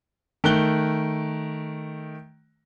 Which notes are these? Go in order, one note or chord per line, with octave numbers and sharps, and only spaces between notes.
D#3 A3 F#6 G7